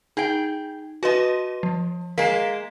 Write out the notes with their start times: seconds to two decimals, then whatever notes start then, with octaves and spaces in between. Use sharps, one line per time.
0.17 D#4 G#4 G5
1.03 F#4 B4 D#5 A5 C6
1.63 F3
2.18 G#3 A#3 B6 E7